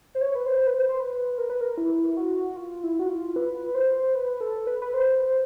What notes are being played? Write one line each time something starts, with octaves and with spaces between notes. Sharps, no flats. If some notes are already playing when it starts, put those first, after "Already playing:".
C5
C#5
B4
C5
B4
C5
C5
B4
A#4
B4
A#4
E4
F#4
F4
E4
F#4
F4
B4
C5
B4
A4
B4
B4
C5